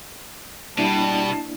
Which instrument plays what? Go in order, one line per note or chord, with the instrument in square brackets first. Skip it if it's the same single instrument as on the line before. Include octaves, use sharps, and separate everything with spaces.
[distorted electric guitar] B2 [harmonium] G3 [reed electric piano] A#3 D4 E4 [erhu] A5